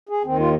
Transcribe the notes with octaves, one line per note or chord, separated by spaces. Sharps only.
G#4
D#2 D#3 C4
F4